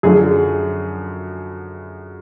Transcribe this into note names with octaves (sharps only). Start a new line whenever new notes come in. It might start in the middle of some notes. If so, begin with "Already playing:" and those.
F#2 D3 F3 G#4